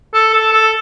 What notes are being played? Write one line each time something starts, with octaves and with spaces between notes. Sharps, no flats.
A4
A4
A4